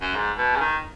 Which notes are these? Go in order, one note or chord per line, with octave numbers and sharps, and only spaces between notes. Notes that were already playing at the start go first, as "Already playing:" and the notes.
F#2
G#2
B2
C#3
D#3